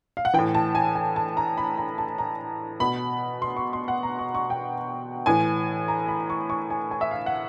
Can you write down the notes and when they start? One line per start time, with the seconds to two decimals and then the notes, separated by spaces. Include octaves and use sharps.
0.17 F5
0.25 F#5
0.34 E3 G5
0.39 A2
0.55 A5
0.75 G#5
0.95 G#5
1.16 A5
1.37 A#5
1.57 B5
1.77 A#5
1.98 A5
2.18 A#5
2.80 B2 B5
3.42 C6
3.57 C#6
3.73 C6
3.88 F#5
4.03 A#5
4.19 C#6
4.35 C#6
4.50 G5
5.26 A2 E3 G#5
5.88 A#5
6.08 B5
6.30 C#6
6.50 C#6
6.70 G#5
6.91 G#5
7.01 E5
7.11 F5
7.26 F#5